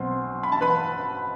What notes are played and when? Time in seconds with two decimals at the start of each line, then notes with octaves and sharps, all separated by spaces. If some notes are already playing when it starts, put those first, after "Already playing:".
Already playing: B1 B2 F#3 C4 C6
0.43 B5
0.52 A5
0.61 B4 B5